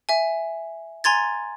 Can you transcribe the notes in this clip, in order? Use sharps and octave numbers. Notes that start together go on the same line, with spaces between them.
E5 G#5
G#5 A#5 C6 G#6 A6